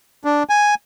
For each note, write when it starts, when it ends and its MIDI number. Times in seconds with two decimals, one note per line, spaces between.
0.24 0.43 62
0.49 0.75 80